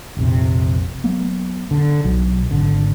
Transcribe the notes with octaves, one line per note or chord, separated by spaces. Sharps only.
F1 A#1 C3
F#3 A#3 B3
D3
B1 F#3
G#1 D3